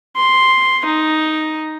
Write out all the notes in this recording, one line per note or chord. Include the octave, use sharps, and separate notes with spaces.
C6
D#4